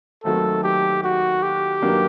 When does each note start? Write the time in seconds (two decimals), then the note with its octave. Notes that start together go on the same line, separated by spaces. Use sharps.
0.24 D#2 D#3 F#3 A3 C4 A4
0.64 G4
1.04 F#4
1.42 G4
1.82 G2 D#3 F#3 A#3 D4